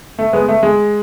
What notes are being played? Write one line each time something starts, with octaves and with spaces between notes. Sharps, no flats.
A3
G#3 B3
A3
G#3